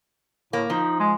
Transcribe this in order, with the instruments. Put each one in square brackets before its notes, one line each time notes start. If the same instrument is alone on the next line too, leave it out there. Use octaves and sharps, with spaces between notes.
[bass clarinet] A2 [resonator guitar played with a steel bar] A#3
[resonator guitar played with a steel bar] F3 [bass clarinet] D#4
[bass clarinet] G#3